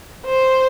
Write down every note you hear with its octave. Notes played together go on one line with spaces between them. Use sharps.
C5